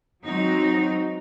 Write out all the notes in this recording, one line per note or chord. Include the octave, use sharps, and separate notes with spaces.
F#3 G#3 C4 D#4 F#4